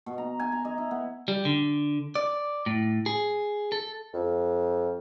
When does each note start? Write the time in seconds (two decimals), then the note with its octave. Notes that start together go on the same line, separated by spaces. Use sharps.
0.06 B2
0.18 A#5
0.40 G#5
0.52 A#5
0.65 D#5
0.78 E4
0.91 B3
1.28 G3
1.45 D3
2.15 D5
2.66 A2
3.06 G#4
3.72 A4
4.13 F2